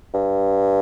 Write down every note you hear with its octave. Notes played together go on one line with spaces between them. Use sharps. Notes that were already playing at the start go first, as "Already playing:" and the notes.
G2